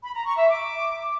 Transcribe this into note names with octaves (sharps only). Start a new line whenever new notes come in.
B5
A#5
C#6
E5
D6